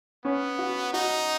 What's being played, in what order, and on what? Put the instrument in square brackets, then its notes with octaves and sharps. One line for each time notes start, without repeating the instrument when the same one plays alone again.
[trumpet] B3 [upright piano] C#4
[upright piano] F#4
[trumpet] D#4 [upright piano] F#4